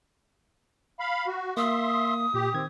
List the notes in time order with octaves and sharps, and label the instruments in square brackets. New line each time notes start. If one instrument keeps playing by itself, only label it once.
[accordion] F5 B5
F#4
[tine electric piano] A#3 [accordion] E5 C6 [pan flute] D#6
[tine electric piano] A#2 [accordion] G4
[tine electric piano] D#3 G#6 [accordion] C4